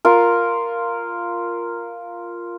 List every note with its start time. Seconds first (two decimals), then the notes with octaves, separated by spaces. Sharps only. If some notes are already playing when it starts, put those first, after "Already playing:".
0.05 F4 A#4